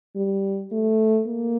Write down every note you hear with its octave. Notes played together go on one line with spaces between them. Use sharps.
G3
A3
A#3